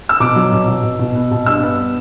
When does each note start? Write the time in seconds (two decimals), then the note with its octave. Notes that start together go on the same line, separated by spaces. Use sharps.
0.09 E6
0.20 B2 D6
0.36 F#3
0.52 B2
0.68 B2
0.84 B2
0.99 B2
1.15 B3
1.31 B2
1.46 G2 E6
1.62 B3